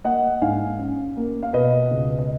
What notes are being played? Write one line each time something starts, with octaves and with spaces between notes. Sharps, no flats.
A#3 D#5 F#5
G#2 F5 G#5
C#4
A#3
F5
B2 B4 D#5
C#2
D#5